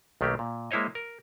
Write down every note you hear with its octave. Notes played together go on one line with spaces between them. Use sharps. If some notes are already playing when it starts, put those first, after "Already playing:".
B1 D#3 A3 A#3 G4
A#2
G#3 A#3 E4 C5 C#5 D#5
A#4